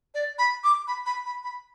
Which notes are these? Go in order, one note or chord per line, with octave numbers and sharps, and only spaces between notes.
D5
B5
D6
B5
B5
B5
B5